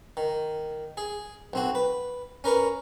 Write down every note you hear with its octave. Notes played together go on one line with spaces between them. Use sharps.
D#3
G#4
B1 C4 F#4
B4
C#4 A#4 B4 C#6